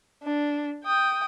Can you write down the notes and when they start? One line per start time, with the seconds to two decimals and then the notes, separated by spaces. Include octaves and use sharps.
0.23 D4
0.85 G5 D#6